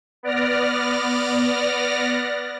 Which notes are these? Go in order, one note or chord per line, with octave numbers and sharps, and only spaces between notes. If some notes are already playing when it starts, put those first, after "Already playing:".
B3 D5 F6 A#6